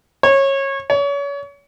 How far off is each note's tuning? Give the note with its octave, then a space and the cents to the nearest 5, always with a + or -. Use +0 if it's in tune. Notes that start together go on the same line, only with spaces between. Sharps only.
C#5 -20
C#5 +35